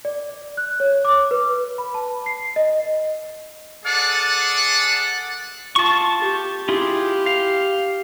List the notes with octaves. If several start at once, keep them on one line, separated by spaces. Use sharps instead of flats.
D5
F#6
C#5
D6
B4
B5
A5
C7
D#5
G#4 A4 D5 F#5
F4 A5 C#6
G4
E4 F4 G4 G#4
F5